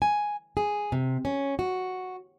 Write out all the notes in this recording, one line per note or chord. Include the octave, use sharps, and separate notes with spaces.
G#5
G#4
C3
C#4
F#4